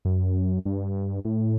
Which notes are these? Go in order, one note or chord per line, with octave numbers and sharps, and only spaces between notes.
F#2
G2
A2